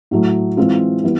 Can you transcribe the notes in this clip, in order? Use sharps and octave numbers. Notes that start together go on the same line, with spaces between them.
A2 F#3 A3
E3 G#3 C4 F4
E3 G3 B3